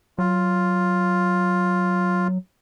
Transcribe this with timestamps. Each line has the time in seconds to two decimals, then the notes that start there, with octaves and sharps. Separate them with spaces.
0.18 F#3 F4